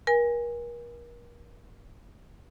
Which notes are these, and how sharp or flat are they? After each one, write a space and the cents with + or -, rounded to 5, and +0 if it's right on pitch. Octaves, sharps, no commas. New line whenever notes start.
A#4 +40 G#5 -20